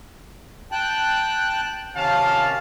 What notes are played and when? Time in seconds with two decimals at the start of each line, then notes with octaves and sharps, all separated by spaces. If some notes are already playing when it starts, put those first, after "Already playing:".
0.72 G5 A5 F#6
1.95 C3 D#3 C#4 F5 A5